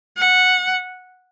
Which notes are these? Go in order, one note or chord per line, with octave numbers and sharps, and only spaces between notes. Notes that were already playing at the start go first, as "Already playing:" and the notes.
F#5